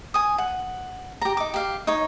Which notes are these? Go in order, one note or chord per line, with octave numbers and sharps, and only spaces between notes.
G#5 D#6
F#5
G4 A#5
D#4 D6
G4 F5
D#4 C#5